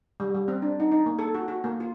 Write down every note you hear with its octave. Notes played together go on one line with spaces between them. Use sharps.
G3
G3
C4
D4
D#4
D#4
A#3
A4
F#4
F#4
A#3
F4